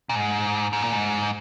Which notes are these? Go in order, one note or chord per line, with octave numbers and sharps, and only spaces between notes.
A#2
G#2
G#2
A#2
G#2